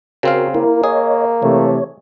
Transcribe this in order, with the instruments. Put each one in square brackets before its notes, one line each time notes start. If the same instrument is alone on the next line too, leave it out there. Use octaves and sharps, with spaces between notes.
[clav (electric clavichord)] C#3 C4 F5 [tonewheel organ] F#4 A#4
[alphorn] A#3 [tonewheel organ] E4 A#4
[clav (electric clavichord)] G#4 [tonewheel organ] C#5 D#5
[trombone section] C3 E3 A3 [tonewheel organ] C#5